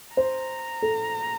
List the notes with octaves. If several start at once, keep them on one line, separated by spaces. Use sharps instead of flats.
C5 A#5
A4